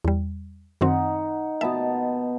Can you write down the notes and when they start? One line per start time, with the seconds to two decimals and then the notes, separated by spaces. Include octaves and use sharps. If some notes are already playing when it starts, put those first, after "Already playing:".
0.04 E2 G3
0.81 F#2 D#3 C4 D#4 F#5
1.61 B2 B3 E5 A5